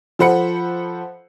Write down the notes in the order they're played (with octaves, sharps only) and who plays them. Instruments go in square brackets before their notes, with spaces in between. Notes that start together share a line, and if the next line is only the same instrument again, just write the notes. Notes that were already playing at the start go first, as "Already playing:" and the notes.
[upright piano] F3 A4 C5 F#5 B5 C#7